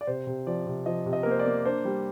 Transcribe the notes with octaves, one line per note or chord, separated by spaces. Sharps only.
D5
C3 C5
C3
F3 D5
C3
F3 D#5
C3
D#5
A#3 A#4
C5
D5
A#3
D4 C5
G3